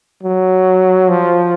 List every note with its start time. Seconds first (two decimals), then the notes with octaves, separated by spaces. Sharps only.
0.23 F#3
1.09 F3